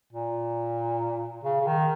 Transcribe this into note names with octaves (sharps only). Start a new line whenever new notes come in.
A#2
C#3
C#3
D#3